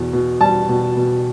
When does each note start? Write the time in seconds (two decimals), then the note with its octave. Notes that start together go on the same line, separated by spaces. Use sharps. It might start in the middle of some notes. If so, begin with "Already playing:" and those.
Already playing: E2 B2
0.13 B2
0.40 G3 A5
0.69 B2
0.97 B2